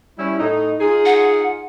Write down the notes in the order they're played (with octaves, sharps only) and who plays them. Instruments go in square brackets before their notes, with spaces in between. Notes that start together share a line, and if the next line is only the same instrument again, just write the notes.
[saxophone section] G3 C#4 E4
A2 D#4
D#4 F4 G#4
[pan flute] F#5